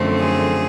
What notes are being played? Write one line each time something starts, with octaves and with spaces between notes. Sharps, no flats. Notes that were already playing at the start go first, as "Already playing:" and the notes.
Already playing: F#2 D3 F3 A3 C4
G#4